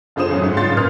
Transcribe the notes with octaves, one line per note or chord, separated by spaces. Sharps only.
F#1 D3 F4 C5 D#6 E7
A1 F#2 F#3
G#2
C#2 G2 C#4 F4 C6 A6
F#2 A#2 B4 D#6 F6